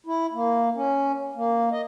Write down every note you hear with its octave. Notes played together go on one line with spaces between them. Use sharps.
E4
A#3
C#4
A#3
D#5